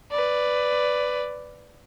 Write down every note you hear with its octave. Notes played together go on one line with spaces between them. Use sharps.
B4 D5